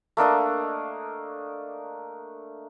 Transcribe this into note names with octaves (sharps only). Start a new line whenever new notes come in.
A3 A#3 D4 D#5